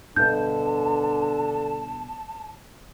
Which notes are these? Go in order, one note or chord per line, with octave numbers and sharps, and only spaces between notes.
G2 B2 D3 A5 G6